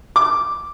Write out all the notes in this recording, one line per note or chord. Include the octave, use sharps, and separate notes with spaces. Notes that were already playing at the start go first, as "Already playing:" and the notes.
D6